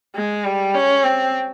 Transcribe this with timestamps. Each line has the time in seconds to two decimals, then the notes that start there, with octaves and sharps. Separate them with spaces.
0.16 G#3
0.45 G3
0.75 C#4
1.04 C4